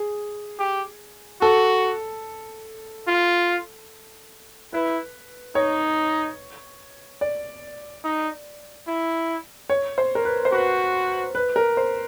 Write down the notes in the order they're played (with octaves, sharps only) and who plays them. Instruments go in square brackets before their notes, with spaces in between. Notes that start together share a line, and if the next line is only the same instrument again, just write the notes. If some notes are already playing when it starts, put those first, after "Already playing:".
Already playing: [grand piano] G#4
[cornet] G4
[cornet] F#4 [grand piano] A4
[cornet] F4
[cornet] E4 [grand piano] B4
[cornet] D#4 [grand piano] C#5
[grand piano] D5
[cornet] D#4
E4
[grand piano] C#5
C5
A#4
B4
C5
[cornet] F#4 [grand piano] B4
[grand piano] B4
A#4
C5